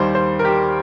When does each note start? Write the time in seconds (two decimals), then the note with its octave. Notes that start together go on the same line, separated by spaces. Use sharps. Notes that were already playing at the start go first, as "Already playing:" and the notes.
Already playing: D#2 D#3 G3 C5
0.15 C5
0.39 A#4
0.45 G4